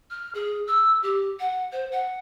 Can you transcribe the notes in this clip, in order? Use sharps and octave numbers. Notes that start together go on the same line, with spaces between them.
F6
G#4
E6
G4
F#5
C5
F#5